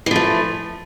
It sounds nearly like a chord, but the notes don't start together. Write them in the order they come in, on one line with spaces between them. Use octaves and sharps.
E3 F3 A3